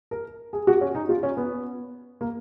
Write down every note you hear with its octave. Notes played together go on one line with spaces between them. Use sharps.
A#4
G#4
F#4
C#4
D#4
F4
C#4
B3
A#3